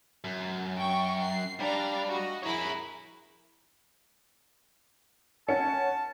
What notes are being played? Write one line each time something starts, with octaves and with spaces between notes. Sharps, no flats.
F#2
G5 C#6
C7
G3 D4 F5 A#5
F#4 D#5
E4 G#4 A#4 C#5 B5
C#4 F#5 A5 C#7